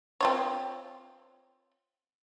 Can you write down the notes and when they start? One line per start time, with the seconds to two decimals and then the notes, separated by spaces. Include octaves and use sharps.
0.21 C4 F4 C#5